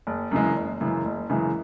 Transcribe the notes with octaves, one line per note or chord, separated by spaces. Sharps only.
F#1
F#2 C#3 E3 G#3
F#1
F#2 C#3 E3 G#3
F#1
F#2 C#3 E3 G#3